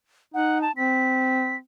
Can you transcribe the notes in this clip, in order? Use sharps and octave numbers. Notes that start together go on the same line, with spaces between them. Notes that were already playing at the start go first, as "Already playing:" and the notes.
D#4 F#5
A5
C4 B6